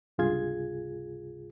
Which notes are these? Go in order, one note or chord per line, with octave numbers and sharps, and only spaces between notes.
C#2 G2 C3 F4 G#4 G#6